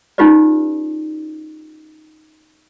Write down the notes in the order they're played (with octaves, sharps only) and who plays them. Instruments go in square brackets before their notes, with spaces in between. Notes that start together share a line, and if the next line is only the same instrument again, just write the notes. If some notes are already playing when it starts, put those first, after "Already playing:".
[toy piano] C#4 D#4 F4 G4 B4 D5